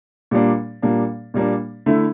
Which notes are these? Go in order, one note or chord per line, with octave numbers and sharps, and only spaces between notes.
A#2 G3 A#3 D4
A#2 G3 A#3 D4
A#2 G3 A#3 D4
D3 A3 E4